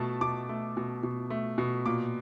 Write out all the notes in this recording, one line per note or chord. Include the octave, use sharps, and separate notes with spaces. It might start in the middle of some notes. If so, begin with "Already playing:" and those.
Already playing: B2 A3 A5
B2 D6
A3
B2
B2
A3
B2
A#2 D6